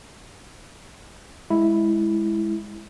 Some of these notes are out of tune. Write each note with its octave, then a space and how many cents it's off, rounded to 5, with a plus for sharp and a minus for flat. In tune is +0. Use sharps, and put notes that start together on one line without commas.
G#3 +0 E4 +0